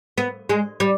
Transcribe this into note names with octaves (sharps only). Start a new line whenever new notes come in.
B3
G#3
G3